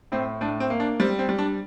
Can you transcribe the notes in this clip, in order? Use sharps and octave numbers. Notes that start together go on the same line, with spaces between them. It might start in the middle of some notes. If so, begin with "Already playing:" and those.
A2 C4
A2 D4
C4
A#3
D4
G3 C4
C4
G3
D4